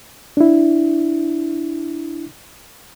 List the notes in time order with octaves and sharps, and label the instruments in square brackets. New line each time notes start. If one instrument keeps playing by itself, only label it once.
[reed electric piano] D4 E4